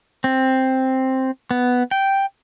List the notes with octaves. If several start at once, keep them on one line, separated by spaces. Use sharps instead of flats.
C4
B3
G5